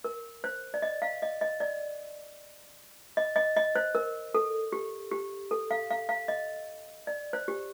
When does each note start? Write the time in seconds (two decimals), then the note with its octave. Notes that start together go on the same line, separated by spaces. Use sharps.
0.04 A#4
0.44 C5
0.74 D5
0.82 D#5
1.02 F5
1.22 D#5
1.41 D#5
1.60 D5
3.17 D#5
3.36 D#5
3.56 D#5
3.75 C5
3.95 A#4
4.34 A4
4.72 G4
5.11 G4
5.51 A4
5.71 F5
5.91 F5
6.09 F5
6.28 D#5
7.07 D5
7.33 C5
7.48 G4